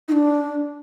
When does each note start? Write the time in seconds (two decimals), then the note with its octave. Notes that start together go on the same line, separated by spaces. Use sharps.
0.08 D#4
0.12 D4